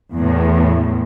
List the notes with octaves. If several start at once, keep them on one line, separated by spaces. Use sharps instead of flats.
E2 A2